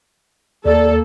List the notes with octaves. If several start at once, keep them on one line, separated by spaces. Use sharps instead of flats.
D#2 A#3 A4 D5